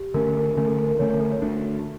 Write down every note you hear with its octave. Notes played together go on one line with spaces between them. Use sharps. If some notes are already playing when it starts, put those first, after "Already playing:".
Already playing: G4
D3 A3 C#4 A#4
D3 A3 C#4 A#4
A4
A4
A#4
D3 A3 C#4 C#5
C#5
A4
C#5
D3 A3 D4 A4